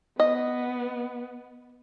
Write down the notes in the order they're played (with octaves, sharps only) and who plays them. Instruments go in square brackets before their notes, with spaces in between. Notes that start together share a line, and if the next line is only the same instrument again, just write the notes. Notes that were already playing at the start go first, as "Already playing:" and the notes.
[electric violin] B3 [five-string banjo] D#5